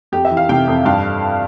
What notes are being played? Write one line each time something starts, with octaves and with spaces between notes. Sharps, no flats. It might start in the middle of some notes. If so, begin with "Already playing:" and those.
F2 G4
E5
E3
F5
C3 G5
F2
G2 F5